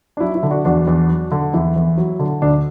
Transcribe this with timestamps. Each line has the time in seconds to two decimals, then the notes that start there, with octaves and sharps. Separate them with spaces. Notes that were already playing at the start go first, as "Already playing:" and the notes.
0.17 D4
0.20 F#3 E4
0.35 E4
0.43 D3
0.51 D4 F#4
0.65 E2 D4 F#4
0.87 E2
1.09 F#3
1.31 D3
1.53 E2 E4
1.76 E2
1.98 F#3
2.19 D3
2.42 D2 D4